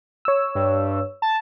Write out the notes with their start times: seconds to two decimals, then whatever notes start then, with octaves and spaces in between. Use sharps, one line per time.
0.25 C#5 E6
0.55 G2
1.22 A5